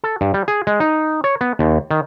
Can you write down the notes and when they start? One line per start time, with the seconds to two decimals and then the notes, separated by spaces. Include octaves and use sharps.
0.04 A4
0.21 G2
0.34 G3
0.48 G#4
0.67 G#3
0.80 D#4
1.24 C#5
1.41 B3
1.59 D#2
1.91 D#3